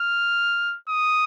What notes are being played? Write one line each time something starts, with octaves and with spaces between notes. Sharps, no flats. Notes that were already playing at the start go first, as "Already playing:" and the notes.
Already playing: F6
D#6